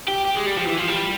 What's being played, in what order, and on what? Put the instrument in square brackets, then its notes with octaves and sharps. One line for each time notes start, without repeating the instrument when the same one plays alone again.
[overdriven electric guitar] G4
G4
G#3
G3
F3
E3
F3
G3